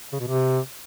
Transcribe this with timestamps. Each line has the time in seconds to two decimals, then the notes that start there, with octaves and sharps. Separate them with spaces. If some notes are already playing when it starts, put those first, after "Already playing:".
0.12 C#3
0.20 B2
0.28 C3